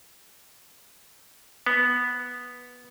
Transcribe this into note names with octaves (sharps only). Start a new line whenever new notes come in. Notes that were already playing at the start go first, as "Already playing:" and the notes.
B3